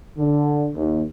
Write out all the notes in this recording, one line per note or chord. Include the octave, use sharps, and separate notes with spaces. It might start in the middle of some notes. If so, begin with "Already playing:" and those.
D3
D#2